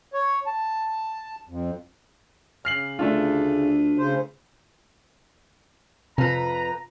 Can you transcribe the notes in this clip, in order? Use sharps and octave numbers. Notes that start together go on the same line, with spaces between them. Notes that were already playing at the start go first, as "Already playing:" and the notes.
C#5
A5
F2
C#3 F6 C7 F#7
D2 A3 D4 F4
C#3 C5
F2 C3 B4 A#5